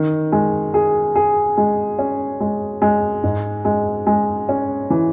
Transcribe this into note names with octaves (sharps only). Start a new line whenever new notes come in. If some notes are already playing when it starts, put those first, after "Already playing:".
Already playing: D#3
G#3
G#4
G#4
G#3
C#4
G#3
G#3
G#2
G#3
G#3
C#4
E3